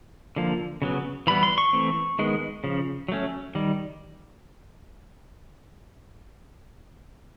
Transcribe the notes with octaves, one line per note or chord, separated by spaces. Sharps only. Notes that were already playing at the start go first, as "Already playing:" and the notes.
D3 F3 A#3
C#3 F#3 B3
E3 G3 B3 B5
C6
C#6
E3 A3 C4
D#3 G#3 B3
C#3 F3
F#3 A3 C#4
D#3 G3